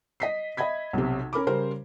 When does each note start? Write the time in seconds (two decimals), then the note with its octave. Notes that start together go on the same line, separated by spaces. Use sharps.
0.20 D#5 B6 C7
0.57 D#5 E5 B5 G#6 B6
0.93 B1 C3
1.33 C#4 A#4 B5 D6
1.47 C#3 G3 A#4 C5